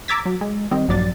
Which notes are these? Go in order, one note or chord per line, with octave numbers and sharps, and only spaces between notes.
A#5 D6 E6 G#6 A6 B6
F#3
G#3
D#3 G3 C4 D#5
A#1 G2 F#3 D5 A6